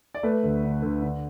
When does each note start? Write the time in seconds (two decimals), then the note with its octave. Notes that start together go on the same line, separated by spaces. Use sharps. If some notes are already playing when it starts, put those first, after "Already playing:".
0.14 D5
0.23 A3 B4
0.43 D2
0.63 D3
0.82 D2
1.02 D3